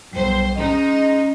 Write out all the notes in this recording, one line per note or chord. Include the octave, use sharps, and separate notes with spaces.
B1 G3 C5
G#3 C#4 D#4 D#5